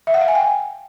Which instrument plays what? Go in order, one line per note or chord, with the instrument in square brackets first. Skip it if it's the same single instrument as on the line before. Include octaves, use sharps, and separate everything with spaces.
[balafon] E5
F#5
F5
G#5
G5